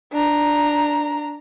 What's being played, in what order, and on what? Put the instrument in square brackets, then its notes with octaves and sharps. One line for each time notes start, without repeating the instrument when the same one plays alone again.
[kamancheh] D4 A#5